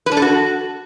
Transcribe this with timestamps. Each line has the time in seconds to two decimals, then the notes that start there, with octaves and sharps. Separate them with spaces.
0.06 B4
0.12 D4
0.17 A4
0.22 F#4